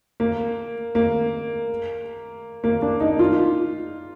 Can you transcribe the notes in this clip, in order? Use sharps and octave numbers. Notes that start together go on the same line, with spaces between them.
A#3
A#3
A#3
D4
D#4
F4